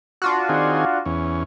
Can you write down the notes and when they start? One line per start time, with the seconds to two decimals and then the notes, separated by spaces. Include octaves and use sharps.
0.22 D4 F4 F#4
0.49 D#3 C4 G#4
1.06 E2 C#4